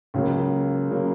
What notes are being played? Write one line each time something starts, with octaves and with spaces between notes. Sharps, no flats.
C#2 C#3 F#3 A#3
C#3 F#3 A#3